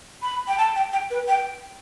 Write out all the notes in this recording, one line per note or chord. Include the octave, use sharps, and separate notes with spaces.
B5
G5
A5
G5
G5
B4
G5